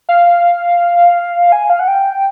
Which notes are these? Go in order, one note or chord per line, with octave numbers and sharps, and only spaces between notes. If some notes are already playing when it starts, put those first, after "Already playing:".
F5
G#5
F5
F#5
G5